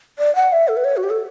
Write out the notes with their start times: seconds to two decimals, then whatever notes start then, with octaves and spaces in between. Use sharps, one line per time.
0.19 D5
0.36 F#5
0.52 E5
0.68 A4
0.77 B4
0.85 C#5
0.97 F#4
1.03 G4
1.10 A4